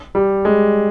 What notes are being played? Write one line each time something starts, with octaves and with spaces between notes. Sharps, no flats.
G3
G#3